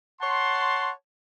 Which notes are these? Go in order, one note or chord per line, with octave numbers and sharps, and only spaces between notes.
C#5 F#5 A5 C6